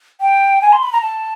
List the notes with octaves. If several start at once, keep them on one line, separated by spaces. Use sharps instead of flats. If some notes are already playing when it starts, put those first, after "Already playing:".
G5
G#5
C6
B5
A#5
A5